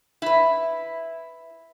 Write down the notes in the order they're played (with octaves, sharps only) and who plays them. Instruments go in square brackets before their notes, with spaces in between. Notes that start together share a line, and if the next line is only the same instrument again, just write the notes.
[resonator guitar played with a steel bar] E4 B4